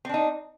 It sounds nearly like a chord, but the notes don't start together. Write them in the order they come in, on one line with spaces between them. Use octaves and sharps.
C4 D4 D#4